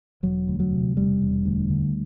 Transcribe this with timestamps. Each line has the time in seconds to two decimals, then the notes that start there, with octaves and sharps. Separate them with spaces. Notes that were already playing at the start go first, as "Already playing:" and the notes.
0.23 E1 F#3
0.48 D2
0.60 F#3
0.73 C3
0.96 E1 G3
1.22 E1
1.45 D2
1.70 D3